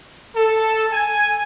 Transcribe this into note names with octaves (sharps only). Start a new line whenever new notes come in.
A4
G#5